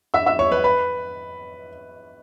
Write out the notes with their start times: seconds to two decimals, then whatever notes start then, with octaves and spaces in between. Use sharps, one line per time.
0.14 E5 E6
0.26 E5 E6
0.39 C#5 C#6
0.52 B4 B5
0.64 B4 B5